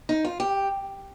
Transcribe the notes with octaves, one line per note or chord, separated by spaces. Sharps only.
D#4
F4
G4